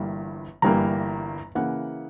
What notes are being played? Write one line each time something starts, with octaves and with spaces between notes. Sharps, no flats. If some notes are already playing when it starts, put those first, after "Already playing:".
Already playing: G1 G2 E3 G3 A#3
G1 G2 E3 G3 A#3 A#5
C#3 E3 A#3 F#5